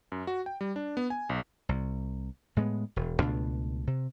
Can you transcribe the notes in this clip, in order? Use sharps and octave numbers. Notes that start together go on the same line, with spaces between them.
F#2
F#4
G5
G3
D4
B3
G#5
B1
C2
A2 G#3 A3 B3
E1
C#2 B2 A3 D4
C3